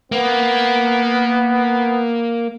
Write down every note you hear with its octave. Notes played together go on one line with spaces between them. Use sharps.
A#3 B3